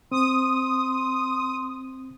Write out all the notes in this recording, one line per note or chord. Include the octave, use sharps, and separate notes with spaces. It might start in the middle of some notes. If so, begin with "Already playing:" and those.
C4 C6 D#6